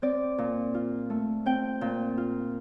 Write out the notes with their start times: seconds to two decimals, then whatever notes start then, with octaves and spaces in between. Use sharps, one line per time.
0.02 C4 D5
0.38 A#2
0.74 F4
1.10 A3
1.46 C4 G5
1.81 A#2
2.17 F4